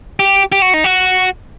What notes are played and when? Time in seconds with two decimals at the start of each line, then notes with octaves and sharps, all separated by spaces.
0.19 G4
0.52 G4
0.62 F#4
0.74 D#4
0.84 F#4